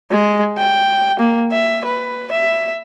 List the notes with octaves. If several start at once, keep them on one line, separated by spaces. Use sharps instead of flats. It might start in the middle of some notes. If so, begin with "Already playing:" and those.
G#3
G5
A#3
E5
B4
E5